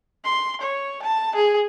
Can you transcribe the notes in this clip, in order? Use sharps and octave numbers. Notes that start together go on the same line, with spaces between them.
C6
C#5
A5
G#4